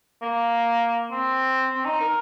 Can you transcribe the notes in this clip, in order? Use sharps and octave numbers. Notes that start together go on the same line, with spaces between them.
A#3
C4
C4
D#4
A#4